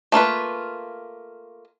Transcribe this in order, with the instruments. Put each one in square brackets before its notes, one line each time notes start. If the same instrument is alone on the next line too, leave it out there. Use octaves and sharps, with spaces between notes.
[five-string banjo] A3 A#3 F4 B4